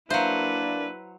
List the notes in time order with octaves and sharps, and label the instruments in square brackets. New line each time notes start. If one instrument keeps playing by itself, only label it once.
[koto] F#3 C5 [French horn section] A#3 D4 [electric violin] E4 B4 [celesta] E5 F5